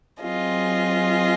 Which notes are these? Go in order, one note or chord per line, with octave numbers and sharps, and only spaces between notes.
F#3 C4 F4 G#4 D#5